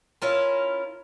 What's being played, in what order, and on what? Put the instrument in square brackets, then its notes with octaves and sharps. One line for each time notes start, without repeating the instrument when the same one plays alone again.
[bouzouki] C#4 E4 F4 A#4